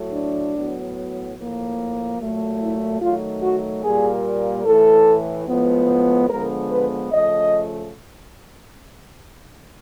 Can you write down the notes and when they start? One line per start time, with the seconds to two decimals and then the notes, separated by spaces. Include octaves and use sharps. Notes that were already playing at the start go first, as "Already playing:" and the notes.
Already playing: A2 F#3 A3
0.13 D4
0.53 A2 F#3 B3
1.36 A2 F3 A#3
2.18 A#2 F#3 A3
2.60 E4
3.00 D#3 F#3 A3 F4
3.42 F#4
3.82 A#2 G3 A#3 G#4
4.64 A2 E3 A3 A4
5.46 A2 F3 G#3 B3
6.29 D3 F3 G#3 B3 A#4
6.70 B4
7.11 C#3 F3 A3 D#5